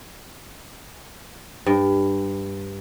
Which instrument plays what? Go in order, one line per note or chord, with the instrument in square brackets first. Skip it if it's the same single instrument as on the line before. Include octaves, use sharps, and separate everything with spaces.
[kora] G2